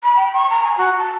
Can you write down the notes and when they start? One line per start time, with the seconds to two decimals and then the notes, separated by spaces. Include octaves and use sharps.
0.03 B5
0.16 G5
0.33 C#6
0.49 A#5
0.62 G#5
0.77 F#4
0.97 A5